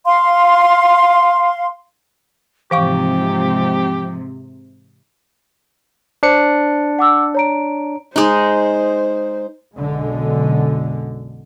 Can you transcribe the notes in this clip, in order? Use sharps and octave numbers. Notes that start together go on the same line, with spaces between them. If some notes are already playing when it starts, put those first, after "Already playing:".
F5 C6
G#2 C3 E3 F3 G4 F5 C#6
D4 C5 C#7
F#5 D6 E6
C#5 A#5 D7
G#3 D#4 C5
B1 F#2 B2 D3 G#3